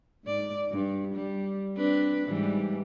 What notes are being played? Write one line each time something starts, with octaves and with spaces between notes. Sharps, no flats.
G#2 D5
G2
G3
C4 D4 B4
G#2 E3 G3